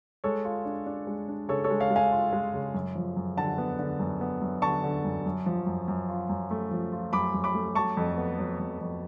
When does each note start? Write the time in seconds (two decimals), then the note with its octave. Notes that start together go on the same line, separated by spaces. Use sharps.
0.24 G#3 A4 C#5
0.45 F4
0.65 D4
0.86 D4
1.07 G#3
1.28 D4
1.48 C#3 A4 C#5
1.64 A4 C#5
1.70 G#3
1.80 C#5 F5
1.90 G#3
1.96 F5 G#5
2.12 F4
2.33 G#3
2.54 C#3
2.74 F#2
2.95 F3
3.16 F#2
3.37 D3 F#5 A5
3.58 B3
3.79 D3
3.99 F#2
4.21 B3
4.41 F#2
4.62 D3 A5 C#6
4.84 D3
5.04 F#2
5.26 F#2
5.46 F3
5.67 F#2
5.88 F#2
6.09 F4
6.29 F#2
6.51 A3
6.71 F3
6.92 F4
7.13 F#2 B5 D6
7.34 F#2
7.44 B5 D6
7.54 A3
7.75 F#3 A5 C#6
7.97 F2
8.17 B3
8.38 F#3
8.59 F2
8.81 F2